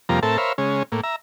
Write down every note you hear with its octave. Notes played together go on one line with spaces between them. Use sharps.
F2 C3 F3 G3 A#3 A#5
A2 C4 A4 A#4 E5 A5
A#4 C5 C#5 E5 F5 B5
C#3 G#3 C#4
A2 A#3
E5 A#5